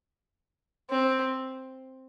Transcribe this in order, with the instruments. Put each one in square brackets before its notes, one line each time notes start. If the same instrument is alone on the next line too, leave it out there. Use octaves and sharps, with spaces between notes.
[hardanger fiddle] C4